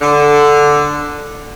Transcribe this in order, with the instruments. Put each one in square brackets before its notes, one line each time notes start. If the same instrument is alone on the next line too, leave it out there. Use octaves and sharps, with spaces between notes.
[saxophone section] D3